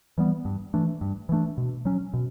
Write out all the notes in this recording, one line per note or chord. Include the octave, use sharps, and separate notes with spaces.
E3 G3 B3
G2
E3 A3 D4
G2
E3 A3 D4
B2
F#3 C#4
B2